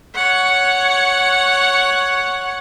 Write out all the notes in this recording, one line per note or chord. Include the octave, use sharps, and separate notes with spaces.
C#5 F#5